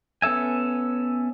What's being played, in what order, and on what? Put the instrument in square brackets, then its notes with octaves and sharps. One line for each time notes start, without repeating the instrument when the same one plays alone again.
[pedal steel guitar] B3 C#4 A4 E5 G#5